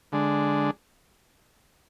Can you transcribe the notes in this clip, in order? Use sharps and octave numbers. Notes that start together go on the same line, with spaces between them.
D3 G#3 D4